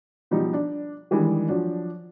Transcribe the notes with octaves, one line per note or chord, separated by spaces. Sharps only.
B2 F3 G3 D#4
D4
D#3 E3 G3 G#3 D4
F3 F#3 D4